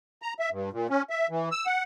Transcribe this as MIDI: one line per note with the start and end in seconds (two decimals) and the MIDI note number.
0.22 0.34 82
0.39 0.49 76
0.51 0.70 43
0.73 0.87 46
0.90 1.02 61
1.10 1.27 76
1.30 1.49 52
1.51 1.66 88
1.66 1.84 78